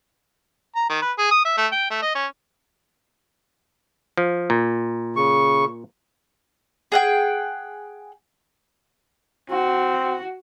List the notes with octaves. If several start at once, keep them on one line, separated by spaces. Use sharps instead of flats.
A#5
D#3
B4
G#4
D#6
E5
A3
G5
A3
D#5
C#4
F3
A#2
C#3 C#6
G#4 F#5 G5
C4 F#4